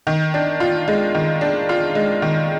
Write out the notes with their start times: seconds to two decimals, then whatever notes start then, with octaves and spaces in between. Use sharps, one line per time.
0.07 D#3
0.34 D4
0.60 F4
0.88 G#3
1.14 D#3
1.41 D4
1.69 F4
1.95 G#3
2.22 D#3